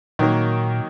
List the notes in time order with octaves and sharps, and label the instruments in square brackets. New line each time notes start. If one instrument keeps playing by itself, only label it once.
[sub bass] A#2 [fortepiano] D#3 F#3 A#3